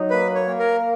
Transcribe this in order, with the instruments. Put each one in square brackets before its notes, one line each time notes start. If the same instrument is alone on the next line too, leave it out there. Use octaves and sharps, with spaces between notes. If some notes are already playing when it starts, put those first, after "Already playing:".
Already playing: [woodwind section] F#3 D#4
[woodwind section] A#3 [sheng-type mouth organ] B4
[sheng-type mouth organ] C#5
[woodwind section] A#3
[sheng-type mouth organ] A#4